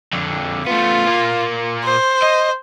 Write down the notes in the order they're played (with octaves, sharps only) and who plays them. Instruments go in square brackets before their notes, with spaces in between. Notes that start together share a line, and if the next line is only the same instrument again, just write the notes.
[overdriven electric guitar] F2 D3
[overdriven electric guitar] A3 B3 [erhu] F4
[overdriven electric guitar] A#2 A#3
[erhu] C5
[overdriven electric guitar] D#5